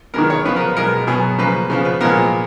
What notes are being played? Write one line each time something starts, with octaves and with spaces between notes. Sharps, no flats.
D#3 G#3 B3 A#4
C#5
C#3 F3 B3 B4
A#4
B4
B2 G#3 B3 A#4
B2 F#3 B3 G#4
C#3 F3 A#3 B4
C#3 F3 B3
B4
A#2 F3 G#3 B3 A#4